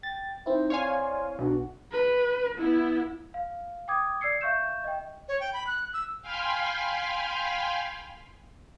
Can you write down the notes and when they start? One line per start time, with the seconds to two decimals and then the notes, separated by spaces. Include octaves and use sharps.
0.03 G5 A6
0.46 C4 D#4 E4 C5
0.70 C#5 D5 F5 G#5 C6
1.39 B1 D4 F#4
1.92 B4
2.58 B3 E4
3.34 F5
3.88 G5 D6 D#6 G#6
4.21 D5 E6 G#6 C7 C#7
4.41 E5 F5 C#6 G6 E7
4.84 D#5 G5
5.28 C#5
5.40 G5
5.53 B5
5.67 F#6
5.94 E6
6.22 F5 G5 G#5 B5 C6 F6